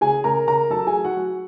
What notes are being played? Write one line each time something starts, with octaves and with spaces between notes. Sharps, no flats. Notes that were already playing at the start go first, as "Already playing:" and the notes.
C#3 G#4 G#5
C#3 A#4 A#5
C#3 A#4 A#5
F#3 A4 A5
G#4 G#5
F#3
F#4 F#5
F#3